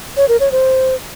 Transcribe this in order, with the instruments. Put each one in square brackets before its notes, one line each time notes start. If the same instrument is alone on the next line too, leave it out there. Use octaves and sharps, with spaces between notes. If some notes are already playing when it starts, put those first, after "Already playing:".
[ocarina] C#5
A#4
C#5
C5